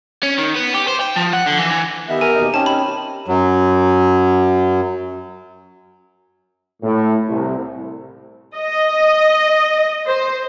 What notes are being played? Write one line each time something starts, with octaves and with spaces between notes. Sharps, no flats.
C#4
D#3
B3
G4
C5
G5
F3
F#5
D3
E3
E3
D#3 B3 G4 E5
A#4 G#5
D#2 B2 D#4
C4 C#4 D#4 A5
B5
F#2 F#3
A2
C2
D#5
C5